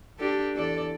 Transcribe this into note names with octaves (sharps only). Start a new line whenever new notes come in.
D4 G4 A4
E2 A4 D5